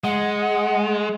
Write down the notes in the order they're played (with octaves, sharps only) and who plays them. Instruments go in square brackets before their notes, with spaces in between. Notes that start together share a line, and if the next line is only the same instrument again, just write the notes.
[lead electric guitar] G#3 [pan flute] F#5